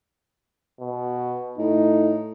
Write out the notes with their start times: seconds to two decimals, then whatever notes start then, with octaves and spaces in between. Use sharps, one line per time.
0.80 B2
1.58 A2 D#4